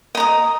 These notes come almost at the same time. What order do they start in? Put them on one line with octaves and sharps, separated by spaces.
D#5 A#5 D#6